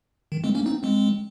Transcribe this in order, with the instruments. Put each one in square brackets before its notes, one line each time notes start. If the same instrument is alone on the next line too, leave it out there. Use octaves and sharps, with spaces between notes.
[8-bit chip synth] D#3
G#3 C4
A#3 C#4
C4 D#4
G#3 C4